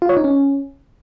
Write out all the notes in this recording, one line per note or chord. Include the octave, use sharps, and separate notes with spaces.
F4
C#5
D#4
C#4